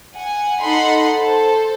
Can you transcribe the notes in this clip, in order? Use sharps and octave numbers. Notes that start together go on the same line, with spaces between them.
F#5 G#5
D#4 A4 D#5 F#5 B5 C6
A4 C5